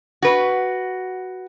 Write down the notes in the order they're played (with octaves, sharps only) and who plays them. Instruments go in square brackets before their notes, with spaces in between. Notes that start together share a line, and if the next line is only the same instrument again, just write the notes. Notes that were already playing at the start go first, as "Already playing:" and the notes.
[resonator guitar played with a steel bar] F#4 B4